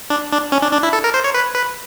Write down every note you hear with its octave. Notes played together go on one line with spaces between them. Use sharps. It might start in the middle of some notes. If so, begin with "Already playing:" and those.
D4
D4
C#4
D4
D4
E4
A4
A#4
C5
C#5
B4
B4